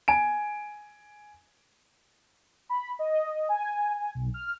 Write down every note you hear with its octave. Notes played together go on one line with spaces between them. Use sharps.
G#5 D7
B5
D#5
G#5
G#5
B1
F6